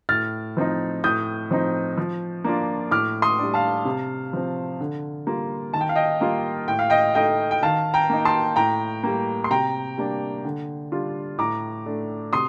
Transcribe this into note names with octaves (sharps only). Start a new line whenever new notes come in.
A2 F6 A6
F3 C4 D#4
A2 D#6 G6
F3 C4 D#4
F3
A#3 D4 F4
A2 D6 F6
C6 D#6
G3 D4
F5 A5
C3
F3 C4
D3
G3 A#3 F4
D#3 A5
G5
F5
D#5 G5
G3 A#3 F4
A2 G5
F5
D#5 G5
A3 D#4 D#5 G5
G5
D#3 F5 A5
G5 A#5
A#3 D#4
A5 C6
A2 G5 A#5
G3 A#3
C6
C3 G5 A#5
G3 A#3 D4
D3
G3 D4 F4
A2 A#5 D6
A3 D4
C3 C6 D#6